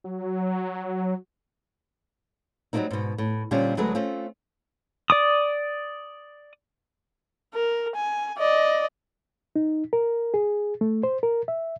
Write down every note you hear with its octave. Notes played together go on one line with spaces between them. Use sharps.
F#3
F#3 G3 A3 A#3 C4 D#4
G#2 B2
A2
A#2 D3 G3 C4 C#4 F4
D2 F#3 G#3 A3 G#4 B4
A3 C4 C#4 F4
D5 D6 D#6
A#4
G#5
D5 D#5
D#4
A#4
G#4
A3
C5
A#4
E5